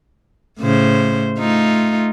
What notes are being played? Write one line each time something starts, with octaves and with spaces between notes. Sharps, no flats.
A2 C#3 C5
A3 D#4 F4